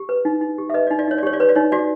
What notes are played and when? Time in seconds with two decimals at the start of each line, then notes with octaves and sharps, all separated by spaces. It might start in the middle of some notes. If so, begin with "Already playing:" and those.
Already playing: G4
0.09 B4
0.25 D#4
0.41 D#4
0.58 G4
0.70 E5
0.74 B4 D#5
0.87 D5
0.90 D#4
0.99 D5
1.08 D#4 C#5
1.18 D5
1.23 G4 C#5
1.33 D5
1.40 B4 C#5
1.49 D5
1.55 D#4 C#5
1.72 F#4 D5